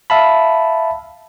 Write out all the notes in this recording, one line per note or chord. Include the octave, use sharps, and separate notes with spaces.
E5 F5 A5 B5